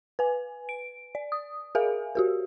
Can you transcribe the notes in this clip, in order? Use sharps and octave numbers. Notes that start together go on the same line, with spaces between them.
B4 G#5
D7
D5
D#6
G#4 A#4 E5 F5 G#5
F#4 G4 A#4